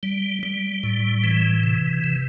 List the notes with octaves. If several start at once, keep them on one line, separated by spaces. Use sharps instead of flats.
G3
G3
A2
E3
C3
C3